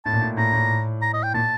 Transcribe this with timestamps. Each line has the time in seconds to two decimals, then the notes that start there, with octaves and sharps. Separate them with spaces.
0.05 A2 A5
0.13 A#2
0.21 A2
0.37 A2 A#5
0.53 A2
1.02 A#5
1.13 D#5
1.23 G5
1.34 A#2 A5